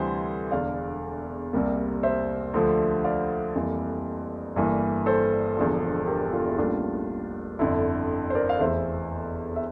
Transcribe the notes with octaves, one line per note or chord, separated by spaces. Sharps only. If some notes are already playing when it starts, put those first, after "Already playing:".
Already playing: D2 C3 E3 G3 C5
E1 E2 D3 D5 F5
C2 C3 G3 A#3
C5 E5
D2 D3 F3 A3
D5 F5
F2 E3 G3 A#3
G1 G2 E3 A#3
A4 C5
E1 E2 D3 F3
G4 A#4
F4 A4
E4
A1 A2 G3 A#3 D4 F4
G1 F2 D3 E4
C5
A#4 D5
F5
F1 E2 E3 C5 E5
E5